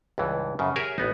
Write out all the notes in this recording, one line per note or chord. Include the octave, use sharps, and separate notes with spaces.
C#2 G2 E3
F#2 C#3
G4 G#4 A#4 C#5 E5 G#5
A1 B3 D#4